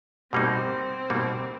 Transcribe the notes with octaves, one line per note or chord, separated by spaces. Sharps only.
B2 G3 A#3 C4 D#4
B2 G3 A#3 D#4